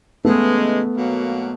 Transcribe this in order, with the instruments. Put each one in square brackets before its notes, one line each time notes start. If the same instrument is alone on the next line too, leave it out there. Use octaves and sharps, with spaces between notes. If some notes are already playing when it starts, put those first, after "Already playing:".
[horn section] C#3 E3 G#3 [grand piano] A3 B3
[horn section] B2 F#3 A#3